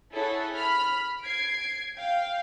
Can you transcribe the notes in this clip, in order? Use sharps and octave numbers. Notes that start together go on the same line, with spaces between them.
E4 G#4 A4 C#5 F#5
B5 F6
G#6 C7 D7
F5 G5